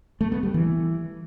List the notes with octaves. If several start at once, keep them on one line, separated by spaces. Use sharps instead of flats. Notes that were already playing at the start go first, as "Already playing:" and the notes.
A3
B3
G3
E3